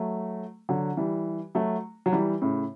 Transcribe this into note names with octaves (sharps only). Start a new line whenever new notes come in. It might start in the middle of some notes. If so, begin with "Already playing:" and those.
Already playing: F#3 A3
D3 F#3
E3 G3
F#3 A3
F#3
E3 G3
A2 C#3